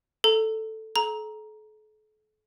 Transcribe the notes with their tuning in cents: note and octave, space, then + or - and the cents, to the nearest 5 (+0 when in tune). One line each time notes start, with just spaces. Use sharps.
A4 +0 A#5 -30
A4 -40 A#5 +10